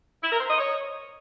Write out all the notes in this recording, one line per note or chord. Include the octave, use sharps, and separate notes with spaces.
E4
A#4
C5
D#5
C#5